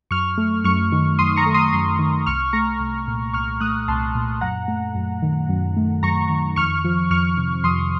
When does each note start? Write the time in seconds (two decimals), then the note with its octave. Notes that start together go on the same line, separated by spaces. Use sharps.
0.11 F#2 C#6 F6
0.38 A3
0.64 F#2 C#6 F6
0.92 D#3
1.19 F#2 C6 D#6
1.36 A#5 C#6
1.46 A3
1.54 C6 D#6
1.72 F#2 C6 D#6
1.99 D#3
2.26 C2 C#6 F6
2.53 A3 A#5 C#6
2.80 C2
3.08 A#2
3.33 C2 C#6 F6
3.60 A3 D#6 F#6
3.88 C2 A5 C6
4.15 A#2
4.41 F#2 F#5 A#5
4.68 A3
4.95 F#2
5.22 D#3
5.49 F#2
5.77 A3
6.03 F#2 A#5 C#6
6.30 D#3
6.56 F2 C#6 F6
6.84 F3
7.10 F2 C#6 F6
7.37 C3
7.64 F2 C6 D#6